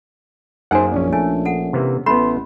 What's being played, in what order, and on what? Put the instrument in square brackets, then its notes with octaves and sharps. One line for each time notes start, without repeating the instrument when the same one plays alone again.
[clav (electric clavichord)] F#2 A#3 G#4 [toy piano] D#4 G#5 [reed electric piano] C5 F#5
[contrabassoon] A#1 [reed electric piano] C#4 D4
[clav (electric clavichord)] A3 [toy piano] G#5
[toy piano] A4 F#5
[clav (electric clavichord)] C3 E3 A#3
[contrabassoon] A1 [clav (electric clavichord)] A3 B3 [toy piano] B5 [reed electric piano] C6